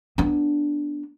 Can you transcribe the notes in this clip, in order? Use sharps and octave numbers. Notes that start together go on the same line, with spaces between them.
B3 D4